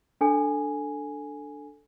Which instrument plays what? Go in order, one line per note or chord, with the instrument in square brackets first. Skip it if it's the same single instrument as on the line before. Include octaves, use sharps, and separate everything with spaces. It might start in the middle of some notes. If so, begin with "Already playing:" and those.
[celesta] D4 A4 G#5